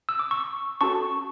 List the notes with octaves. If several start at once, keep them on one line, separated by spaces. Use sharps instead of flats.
E6
D6
C#6 E6
C#4 F#4 A4 A5 C#6